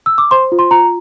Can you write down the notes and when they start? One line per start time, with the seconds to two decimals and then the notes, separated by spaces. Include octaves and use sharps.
0.06 E6
0.18 D6
0.31 C5 C6
0.52 F4
0.59 C6
0.71 F4 A#5